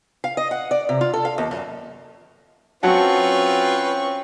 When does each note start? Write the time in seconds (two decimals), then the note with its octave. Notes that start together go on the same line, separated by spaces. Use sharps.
0.24 F5
0.37 D#5
0.51 F#5
0.71 D5
0.89 C3
1.01 F4
1.14 A4
1.25 F5
1.38 D#2
1.51 F#2
2.83 F#3 C4 C#4 F4 B4 F#5 A5 C#6